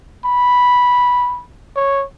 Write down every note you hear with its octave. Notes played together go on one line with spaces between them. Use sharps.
B5
C#5